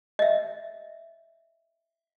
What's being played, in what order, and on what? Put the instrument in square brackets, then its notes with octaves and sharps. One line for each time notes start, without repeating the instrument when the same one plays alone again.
[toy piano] D#5 E5